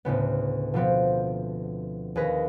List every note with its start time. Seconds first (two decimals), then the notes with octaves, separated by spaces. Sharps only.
0.05 D2 A2 C#3 B3
0.74 B2 F3 B3 C4
2.16 D#2 G#4 B4 A#6